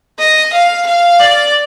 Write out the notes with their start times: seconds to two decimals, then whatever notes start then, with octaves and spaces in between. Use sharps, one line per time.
0.19 D#5
0.53 F5
0.86 F5
1.19 D5